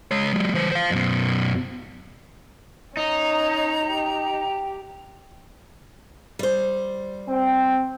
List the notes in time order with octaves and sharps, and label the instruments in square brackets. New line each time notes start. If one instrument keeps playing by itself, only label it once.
[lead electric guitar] G#3 C#5
F#3 G#3
E3 C5
C5 F5
F#2 B2
[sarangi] C#4 [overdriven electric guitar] D#4 [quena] A#5
[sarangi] G4
[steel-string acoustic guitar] G3 C5
[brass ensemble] C4 G5